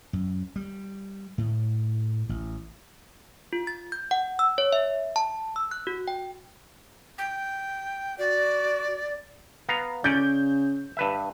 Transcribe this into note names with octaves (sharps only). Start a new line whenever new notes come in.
F#2
G3
A2
A1
F4
A6
G6
F#5
E6
C#5
E5
A5
E6
F#6
F#4
G5
G5
F#4 D5
B3 F5 A#5
C#3 C#4 D5 G6
G2 B4 E5